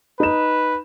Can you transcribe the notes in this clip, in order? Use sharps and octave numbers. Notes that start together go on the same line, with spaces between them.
D#4 B4 E7